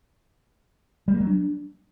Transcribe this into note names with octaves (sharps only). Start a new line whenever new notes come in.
G3
A#3
F#3
D4